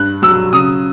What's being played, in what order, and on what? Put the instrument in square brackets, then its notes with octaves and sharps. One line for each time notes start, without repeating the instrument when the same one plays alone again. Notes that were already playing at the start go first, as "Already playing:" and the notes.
Already playing: [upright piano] G2 F#6
F#3 E6
C#3 D#6